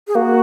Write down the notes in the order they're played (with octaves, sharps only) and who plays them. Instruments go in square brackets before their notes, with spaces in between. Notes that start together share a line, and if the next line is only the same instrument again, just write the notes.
[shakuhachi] G#4
[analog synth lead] A#3 [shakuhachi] F#4